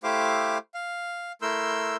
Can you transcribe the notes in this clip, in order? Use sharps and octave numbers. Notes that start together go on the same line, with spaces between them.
A3 E4 G4 C5 F5 D6
F5
A3 E4 A#4 C6 E6 G6